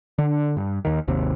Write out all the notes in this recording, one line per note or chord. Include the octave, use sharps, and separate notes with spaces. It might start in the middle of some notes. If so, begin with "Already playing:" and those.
D3 D4
G2
D#2 D#3
G#1 D#2 C3